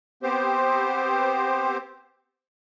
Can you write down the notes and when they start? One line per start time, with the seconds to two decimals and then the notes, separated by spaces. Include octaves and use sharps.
0.23 B3 C4 G4 C5